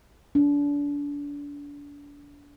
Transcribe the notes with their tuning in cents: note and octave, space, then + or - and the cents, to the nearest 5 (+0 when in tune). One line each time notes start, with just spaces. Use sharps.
D4 -30